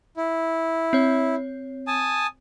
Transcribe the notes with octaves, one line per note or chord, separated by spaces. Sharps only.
E4
C4 C#5
G#5 A5 D#6